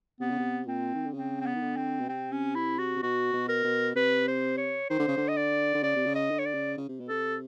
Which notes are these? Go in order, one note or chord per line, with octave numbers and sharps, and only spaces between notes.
C3 B3
C#3
C3
A#2 C4
D#3
D3
C#3 C4
C4
B3
D#3
D3
C4
B2
C3 C4
C#4
E4
F#4
C3
B2 F#4
B2
A#4
B2
C3 B4
C5
C#5
D#3 C5
D3
C#3
D3
D#5
D5
D3
C#3 D5
C3
C#3
D#5
D3
C#5
D5
C#3
C#3
C3
B2
C3 A4